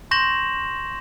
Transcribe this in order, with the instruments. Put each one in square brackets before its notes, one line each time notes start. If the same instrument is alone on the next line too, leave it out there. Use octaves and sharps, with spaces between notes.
[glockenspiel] C6 C#6 G6 A#6 E7 F#7